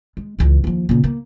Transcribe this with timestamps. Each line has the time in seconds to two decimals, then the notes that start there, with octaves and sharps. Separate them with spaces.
0.17 G#3
0.39 C#2 E3
0.64 D#2 F3
0.89 A#2 C#3
1.04 A#3